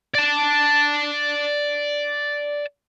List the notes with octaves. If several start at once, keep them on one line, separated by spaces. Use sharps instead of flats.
D5 A5